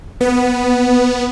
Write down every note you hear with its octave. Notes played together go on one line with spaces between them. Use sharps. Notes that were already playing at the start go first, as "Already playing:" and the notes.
B3